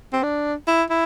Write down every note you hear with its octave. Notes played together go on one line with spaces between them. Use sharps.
C4
D4
E4
E4